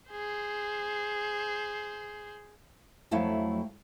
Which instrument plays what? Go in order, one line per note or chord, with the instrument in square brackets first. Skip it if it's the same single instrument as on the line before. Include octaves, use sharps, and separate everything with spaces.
[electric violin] G#4 C5
[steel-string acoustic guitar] F2 F#3 A3 E4 F5